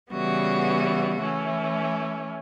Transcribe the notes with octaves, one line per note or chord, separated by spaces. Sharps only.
C#3 E3 G3 B3 F#4
E3 A3 C#4